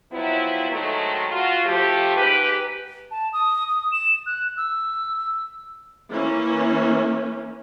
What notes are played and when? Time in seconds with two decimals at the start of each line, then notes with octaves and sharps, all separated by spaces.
0.12 F3 F#3 B3 C4 E4
0.70 G#2 D#3 F#3 G#3 A3
1.32 F4 F#4
1.65 F3 A3 G4
2.16 G#2 G4 B4
3.11 A5
3.33 D#6
3.68 D#6
3.92 E7
4.26 F#6
4.57 E6
6.10 E3 A#3 C#4